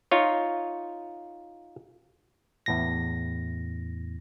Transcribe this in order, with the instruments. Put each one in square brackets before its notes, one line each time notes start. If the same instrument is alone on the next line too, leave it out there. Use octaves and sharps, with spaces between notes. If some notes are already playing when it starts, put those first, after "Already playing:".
[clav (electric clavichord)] D#4 F4 C#5
[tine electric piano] E2 A2 A#6